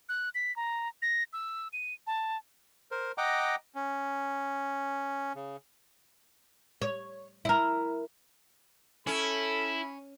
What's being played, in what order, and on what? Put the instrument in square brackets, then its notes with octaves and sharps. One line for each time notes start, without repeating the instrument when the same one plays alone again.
[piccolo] F#6
B6
A#5
A#6
E6
D#7
A5
[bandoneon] A#4 C5
D#5 F#5 G5 A#5 D6
C#4
C#3
[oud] C#5
E4 A#4
[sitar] C#4 [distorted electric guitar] E4 [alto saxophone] A4 [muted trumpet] B5